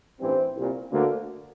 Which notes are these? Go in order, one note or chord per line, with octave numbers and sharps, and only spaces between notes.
A1 G2 E3 C4
C2 A#2
D2 D3 A#3